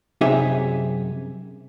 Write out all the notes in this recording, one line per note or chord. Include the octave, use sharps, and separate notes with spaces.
F#2 C3 D#4 G4 G#4 E5